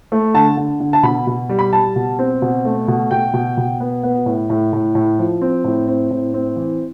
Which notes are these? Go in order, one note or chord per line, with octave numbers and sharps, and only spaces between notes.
A3
D3 A5
D3
D3
A5
B2 B5
B2
G3
B5
G3 A5
B2
C4
B2
A3
B2
B2 G5
B2
B2
B3
B3
A2
A2
A2
A2
F3
C4
A2
C4
A2
C4
E3